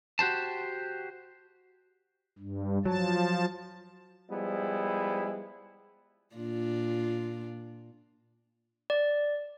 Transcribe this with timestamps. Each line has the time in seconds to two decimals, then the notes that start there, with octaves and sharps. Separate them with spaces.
0.19 F#4 G4 C5 A5
2.39 G2
2.86 F3 F#3 A5
4.30 F3 G3 G#3 B3 E4
6.36 A#2 D4 F4
8.90 D5